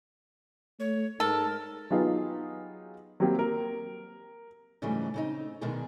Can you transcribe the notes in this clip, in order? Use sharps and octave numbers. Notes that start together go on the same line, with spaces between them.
A3 C#5
G#2 A4 A#4
F#3 B3 D#4 F4 G4 G#4
F#3 G3 A#3 C4 G4
A#4
G#2 C#3 E3 F#3 G3 A3
C#3 C4 D#4
B2 D3 D#3 G#3 D4 G#4